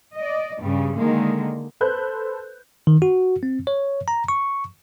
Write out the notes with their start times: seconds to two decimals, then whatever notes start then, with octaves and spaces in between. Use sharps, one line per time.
0.17 D5 D#5
0.61 G2 C#3 G3
0.97 D3 D#3 G#3 A#3
1.81 A4 B4 C5 B5 F#6 G6
2.87 D#3
3.02 F#4
3.43 C4
3.67 C#5
4.08 A#5
4.28 C#6